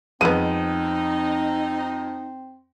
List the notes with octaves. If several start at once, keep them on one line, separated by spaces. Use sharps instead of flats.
F2 G#3 B3 C4 D#4 D#7